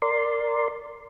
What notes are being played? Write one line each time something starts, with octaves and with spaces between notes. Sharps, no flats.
A#4 D5 C6